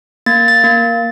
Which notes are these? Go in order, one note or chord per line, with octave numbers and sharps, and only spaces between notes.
A#3 A6
A6
A#3